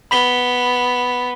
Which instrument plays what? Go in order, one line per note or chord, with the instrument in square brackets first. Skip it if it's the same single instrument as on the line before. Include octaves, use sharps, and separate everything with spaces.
[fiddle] B3 [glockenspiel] B5 B6 G7